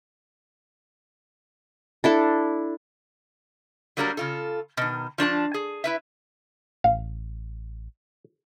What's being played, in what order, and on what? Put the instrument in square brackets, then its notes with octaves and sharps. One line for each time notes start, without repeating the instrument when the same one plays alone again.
[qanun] D4 E4 A4
[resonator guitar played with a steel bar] F#3 G3 A#3 D4 G#4 A#4
C#3 F4 A4
B2 D#3
F3 D4 C5 A5
G#4
E4 B4 E5
[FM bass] A1 [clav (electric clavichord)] F5